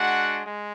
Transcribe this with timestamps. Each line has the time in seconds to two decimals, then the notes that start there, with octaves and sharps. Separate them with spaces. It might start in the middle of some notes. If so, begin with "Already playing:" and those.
Already playing: G#3 D4 F#4 F#5
0.44 G#3